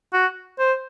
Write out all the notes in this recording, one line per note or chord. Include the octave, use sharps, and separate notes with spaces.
F#4
C5